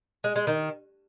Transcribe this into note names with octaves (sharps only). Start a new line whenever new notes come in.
G#3
G#3
D#3